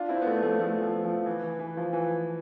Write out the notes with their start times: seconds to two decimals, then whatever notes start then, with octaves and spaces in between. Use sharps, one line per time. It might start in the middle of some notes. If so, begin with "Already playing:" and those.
Already playing: D4 F4
0.09 C4 E4
0.22 B3
0.26 A3 C4
0.42 F3 A3
0.60 F3 A3
0.82 F3
1.05 F3
1.26 E3
1.43 E3
1.59 E3
1.77 F3
1.93 E3